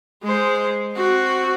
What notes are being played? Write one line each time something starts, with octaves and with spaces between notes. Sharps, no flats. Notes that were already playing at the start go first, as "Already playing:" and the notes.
G#3 C5
C4 F#4